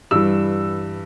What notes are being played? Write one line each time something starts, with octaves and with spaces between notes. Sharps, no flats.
G2 E3 G3 E6